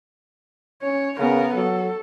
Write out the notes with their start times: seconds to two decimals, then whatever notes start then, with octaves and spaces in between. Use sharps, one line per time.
0.83 C#4 C#5
1.19 C#3 B3 A#4
1.54 F#3 A4